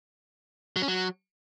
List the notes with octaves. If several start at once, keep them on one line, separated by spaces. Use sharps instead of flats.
F#3
C#4
F#3